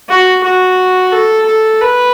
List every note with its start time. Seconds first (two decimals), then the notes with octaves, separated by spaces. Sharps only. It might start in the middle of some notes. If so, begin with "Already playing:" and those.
0.09 F#4
0.43 F#4
1.12 A4
1.46 A4
1.81 B4